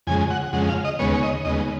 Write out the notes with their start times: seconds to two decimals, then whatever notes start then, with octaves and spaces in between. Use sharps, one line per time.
0.07 F2 C#3 G#3 G#5
0.31 F#5
0.53 F2 C#3 G#3 F#5
0.69 F5
0.85 D#5
0.99 D#2 C#3 G#3 B3 C#5
1.15 C#5
1.23 D#5
1.45 D#2 C#3 G#3 B3 D#5